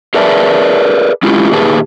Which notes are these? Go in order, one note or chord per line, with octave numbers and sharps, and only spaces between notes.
G#4 A#4 B4 D5 E5 A5
G#3 C#4 E4 F4 G4
A#2 D#3 G4 G#4 B4 A5